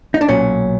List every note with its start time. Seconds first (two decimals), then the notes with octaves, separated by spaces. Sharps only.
0.14 D#4
0.21 D4
0.28 B1 A#2 F#3 C#4